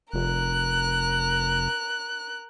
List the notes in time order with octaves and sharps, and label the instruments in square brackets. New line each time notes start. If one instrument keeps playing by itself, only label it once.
[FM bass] F1 [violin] A#4 F#6